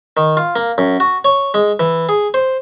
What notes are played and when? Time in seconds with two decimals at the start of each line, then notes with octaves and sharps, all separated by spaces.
0.17 D#3
0.37 F4
0.56 A#3
0.78 F#2
1.00 F#4
1.25 C#5
1.54 G#3
1.80 E3
2.09 G#4
2.34 C5